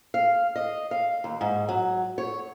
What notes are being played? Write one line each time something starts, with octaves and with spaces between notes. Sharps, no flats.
F5
D#5
F5
D#2
G#2
F#3
C#5